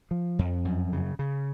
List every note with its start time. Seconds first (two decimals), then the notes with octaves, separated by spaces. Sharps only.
0.11 F3
0.39 F2
0.65 F#2
0.93 C#3
1.19 C#3